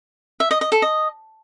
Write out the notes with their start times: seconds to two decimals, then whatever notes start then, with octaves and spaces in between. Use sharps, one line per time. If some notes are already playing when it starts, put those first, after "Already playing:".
0.40 E5
0.51 D#5
0.61 D#5
0.72 A4
0.82 D#5